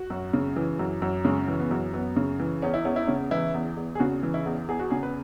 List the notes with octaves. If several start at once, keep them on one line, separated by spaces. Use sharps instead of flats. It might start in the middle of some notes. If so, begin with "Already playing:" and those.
Already playing: F#4
F#2
C#3
E3
F#2
F#2
C#3 G#3
E3
B3
F#2
F#2 B3
C#3
E3
E2 C#4
E4
E2 C#4
E4
C#3 C#4
E3 E4
E2
E2
G#4
C#3 F#4
E3
E4
E2
E2 G#4
F#4
C#3 G#4
B4